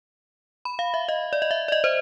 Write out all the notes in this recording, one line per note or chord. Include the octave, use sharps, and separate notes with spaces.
B5
F5
E5
D#5
D5
D#5
E5
D5
D#5
C5